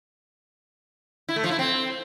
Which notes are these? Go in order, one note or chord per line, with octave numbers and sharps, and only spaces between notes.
E4
A3
F3
E4
C4